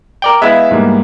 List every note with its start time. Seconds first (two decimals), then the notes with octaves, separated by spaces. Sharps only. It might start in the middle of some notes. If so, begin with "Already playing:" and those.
0.22 A#4 D5 G5
0.42 G#3 B3 E4 E5 F5
0.71 G#2 G3 A#3